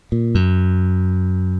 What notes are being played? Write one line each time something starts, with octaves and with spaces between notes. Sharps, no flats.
A#2
F#2